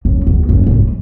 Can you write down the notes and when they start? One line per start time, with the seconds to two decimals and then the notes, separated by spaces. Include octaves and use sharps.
0.05 F#2
0.27 E2
0.49 F#2
0.67 F#2
0.71 G#2